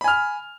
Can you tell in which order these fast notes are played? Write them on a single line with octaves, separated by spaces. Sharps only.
B5 G#5 F6